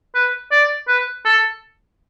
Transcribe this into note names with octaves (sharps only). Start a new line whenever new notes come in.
B4
D5
B4
A4